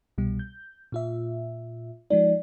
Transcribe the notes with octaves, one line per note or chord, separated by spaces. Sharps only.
C2 B2 G3
G6
A#2 F4 E5
F3 G#3 D#4 D5